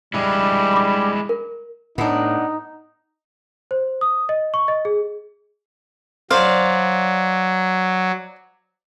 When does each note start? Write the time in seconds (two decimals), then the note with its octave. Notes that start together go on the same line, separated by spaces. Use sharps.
0.14 G3 G#3 E4
0.73 B5 D6
1.29 A#4
1.98 A2 B3 D4 D#4
3.71 C5
4.01 D#6
4.29 D#5
4.54 C#6
4.68 D#5
4.85 G#4
6.30 F#3 C5 D5 F5